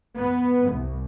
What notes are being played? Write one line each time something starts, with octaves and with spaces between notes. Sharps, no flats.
B3
C2